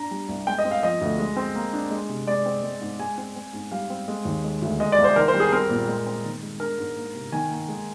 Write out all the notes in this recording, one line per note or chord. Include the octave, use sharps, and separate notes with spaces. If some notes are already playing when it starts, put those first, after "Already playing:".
Already playing: D4 A#5
G3
C2
G#3 G5
D#5
C4
F5
F3 D#5
D2
G#3
C4
A#3
D4
G#3
C3
G#3 D5
C4
G#3
G#2
G#3 G#5
C4
C4
G#2
G3 F5
C4
G#3
D#2
G#3
D2
G#3 D#5
D5
C2
C5
D#3 A#4
C5
G3
G#4
C4 A#4
A#2
G#3
C4
D#3
G#3
D4 A#4
G#2
A#3
C3
D#3 G#5
A#3
G#3